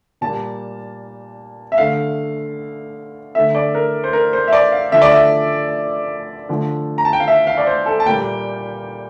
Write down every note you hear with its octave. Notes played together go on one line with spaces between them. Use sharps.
A#2 G3 A#3 A5
E5
D3 A3 F5
D3 A3 E5
D5
A#4
C5
A#4
C5
E5
D5
F5
D3 F3 A3 E5
D5
E5
D3 F3 A3
A#5
A5
G5
F5
E5
F5
D5
C5
A4
A5
A#2 G3 A#3 G5